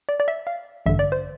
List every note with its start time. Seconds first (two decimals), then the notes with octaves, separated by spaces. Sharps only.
0.09 D5
0.20 D5
0.28 E5
0.47 F5
0.86 A1 G2 D3 E5
0.99 D5
1.12 C5